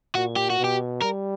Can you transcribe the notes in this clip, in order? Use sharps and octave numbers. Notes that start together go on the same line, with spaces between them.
A#2 F#4
G4
F#4
B2
G4
G3 A#4